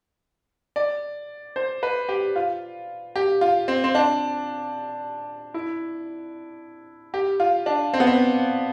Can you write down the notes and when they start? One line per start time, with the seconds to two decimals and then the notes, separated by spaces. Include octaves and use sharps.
0.76 D5
1.56 C5
1.83 B4
2.09 G4
2.36 F4
3.16 G4
3.41 F4
3.68 C4
3.84 C4
3.95 D4
5.54 E4
7.14 G4
7.40 F4
7.66 D4
7.94 C4
8.00 B3
8.07 C4